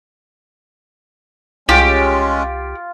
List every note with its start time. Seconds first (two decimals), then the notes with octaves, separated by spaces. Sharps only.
1.69 C2 G#3 C#4 F4 G4